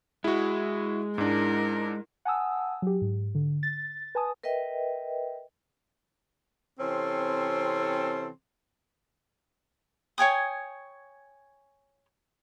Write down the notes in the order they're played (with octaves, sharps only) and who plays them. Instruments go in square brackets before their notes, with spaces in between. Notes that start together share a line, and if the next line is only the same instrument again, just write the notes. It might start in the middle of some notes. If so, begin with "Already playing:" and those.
[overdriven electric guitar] G#3 [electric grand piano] E4 F#4
[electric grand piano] G#2 D4 [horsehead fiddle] E4 A#4
[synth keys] F#5 G#5 A5 D#6 E6
F#3 G4
G#2
D3
A6
B4 G#5 A5 D#6
[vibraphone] A#4 B4 D#5 E5 G5
[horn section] C3 E3 C4 C#4 A4 C6
[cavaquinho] C#5 G5 G#5 D#6